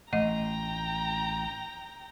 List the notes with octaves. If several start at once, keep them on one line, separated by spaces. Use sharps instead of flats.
A1 A3 D#5 G5 A#5